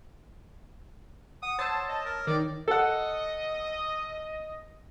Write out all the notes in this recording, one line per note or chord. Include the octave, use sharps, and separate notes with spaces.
F#5 D#6
C5 C#5 A5 D#6 E6
D#5
A#4
D#3 D5
A4 D#5 F#5